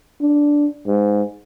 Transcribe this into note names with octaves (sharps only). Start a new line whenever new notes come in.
D4
G#2